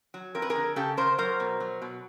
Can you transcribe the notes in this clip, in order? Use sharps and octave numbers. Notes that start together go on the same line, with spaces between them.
F#3
F2 A#4
B4
G#4 A#4
D3
C#3 G4 A4
C#3 A#4 C5
F#3 A#4 C5
B2
F#3
B2